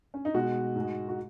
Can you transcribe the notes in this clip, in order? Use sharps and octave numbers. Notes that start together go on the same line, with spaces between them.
C#4
D#4
B2 G#3 F#4
G#2 G#3
F#4